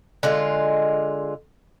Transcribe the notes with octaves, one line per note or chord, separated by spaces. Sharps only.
D3 G#3 F4